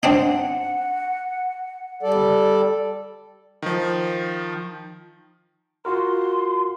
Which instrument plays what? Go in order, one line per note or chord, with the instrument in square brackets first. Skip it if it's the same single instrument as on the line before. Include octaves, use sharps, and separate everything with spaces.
[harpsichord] C4 D4 D#4 [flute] F#5
[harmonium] G3 A4 D5
[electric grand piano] D#3 F3
[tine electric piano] F4 F#4 A#4 [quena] C6